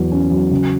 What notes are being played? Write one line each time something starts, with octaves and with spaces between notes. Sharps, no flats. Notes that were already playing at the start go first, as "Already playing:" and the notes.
Already playing: E2 F#3
C#4
F#3
C#3